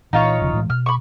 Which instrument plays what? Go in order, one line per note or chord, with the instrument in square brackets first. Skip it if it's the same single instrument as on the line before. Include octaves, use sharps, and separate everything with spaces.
[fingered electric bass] A#2 E3 [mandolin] D#4 F4 C#5
[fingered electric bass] E1 C#3 F3
A2 E3 G#3
[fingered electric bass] B2 [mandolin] F6
[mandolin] B5 C#6